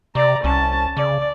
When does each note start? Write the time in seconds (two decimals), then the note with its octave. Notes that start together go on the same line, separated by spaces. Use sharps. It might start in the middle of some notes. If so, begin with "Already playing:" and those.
0.15 C3 D5 A#5
0.44 C2 C#4 A5
0.97 C#3 D5